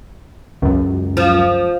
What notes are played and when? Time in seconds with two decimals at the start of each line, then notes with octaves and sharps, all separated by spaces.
0.62 C#2 F#2
1.17 F3